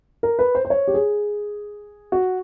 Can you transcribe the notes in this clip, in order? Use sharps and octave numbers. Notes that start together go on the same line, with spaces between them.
A#4
B4
C5
C5
C#5
G4
G#4
F#4